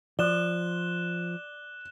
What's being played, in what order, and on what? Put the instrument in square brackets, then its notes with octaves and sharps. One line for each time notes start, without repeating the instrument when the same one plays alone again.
[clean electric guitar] F3 [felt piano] D5 [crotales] F#6 E7 G7